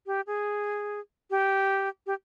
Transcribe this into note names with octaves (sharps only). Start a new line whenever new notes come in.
G4
G#4
G4
G4